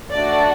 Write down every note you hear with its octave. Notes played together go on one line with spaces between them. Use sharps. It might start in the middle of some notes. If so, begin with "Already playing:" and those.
A3 D4 F#4 D5